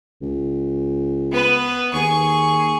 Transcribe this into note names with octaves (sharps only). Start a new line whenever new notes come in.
C#2
B3 B4
D#2 G#4 C#6